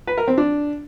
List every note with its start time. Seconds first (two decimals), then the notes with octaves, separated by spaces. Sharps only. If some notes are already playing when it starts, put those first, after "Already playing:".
0.07 B4
0.17 A#4
0.28 C4
0.38 D4